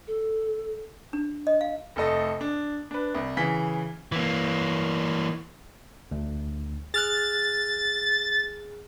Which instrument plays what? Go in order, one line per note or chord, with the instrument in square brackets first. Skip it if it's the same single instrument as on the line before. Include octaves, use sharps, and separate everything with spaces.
[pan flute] A4
[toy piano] D4
D#5
F5
[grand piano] F1 A3 A4 D#5
D4
D4 B4
C2
C#3 E3 B6
[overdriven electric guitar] E3 A#3
[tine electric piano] D2
[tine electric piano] G#4 F6 F#6 [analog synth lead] A6